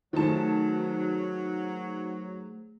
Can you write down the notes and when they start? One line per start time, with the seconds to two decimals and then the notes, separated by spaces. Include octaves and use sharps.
0.13 D#3 F#3 A3 G#4 C5 A5